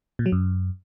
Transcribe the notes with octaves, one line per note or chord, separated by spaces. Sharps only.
A#2
F#3
F#2